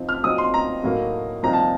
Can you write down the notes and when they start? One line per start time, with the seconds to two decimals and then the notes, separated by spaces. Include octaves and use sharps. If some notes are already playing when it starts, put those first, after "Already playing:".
Already playing: F3 C4 D#4
0.09 F6
0.23 A#2 F#3 C4 D#4 D#6
0.38 C6
0.54 A#5
0.83 A2 F#3 A#3 D#4
1.43 C2 A#2 F3 C4 D#4 A#5
1.53 A5